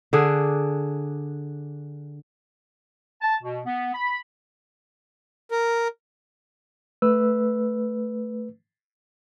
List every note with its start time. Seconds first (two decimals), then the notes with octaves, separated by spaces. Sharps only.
0.13 D3 D4 G#4
3.21 A5
3.43 B2
3.65 B3
3.94 B5
5.51 A#4
7.02 A3 B4 E6